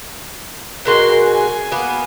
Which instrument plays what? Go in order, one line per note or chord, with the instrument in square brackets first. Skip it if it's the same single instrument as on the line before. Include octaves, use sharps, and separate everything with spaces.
[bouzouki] B2 G#3 F#4 [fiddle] A#4 C6
[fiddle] G#5
[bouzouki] A#3 B3